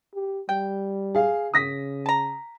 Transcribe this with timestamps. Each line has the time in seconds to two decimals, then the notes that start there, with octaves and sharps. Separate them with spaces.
0.14 G4
0.49 G3 G5
1.15 G#4 F5
1.54 C#3 D#6 A#6 B6
2.06 A5 A#5